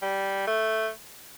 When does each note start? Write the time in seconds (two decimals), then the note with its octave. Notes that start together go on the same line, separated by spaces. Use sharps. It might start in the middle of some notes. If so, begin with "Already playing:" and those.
0.02 G3
0.47 A3